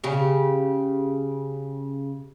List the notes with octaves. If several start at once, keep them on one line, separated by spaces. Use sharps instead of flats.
C#3 G4